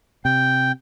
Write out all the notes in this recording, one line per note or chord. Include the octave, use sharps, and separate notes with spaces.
C3 G5